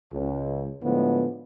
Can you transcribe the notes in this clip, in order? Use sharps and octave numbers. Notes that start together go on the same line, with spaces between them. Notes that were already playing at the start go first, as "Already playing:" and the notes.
C#2
A2 D3 F3 G#3 B3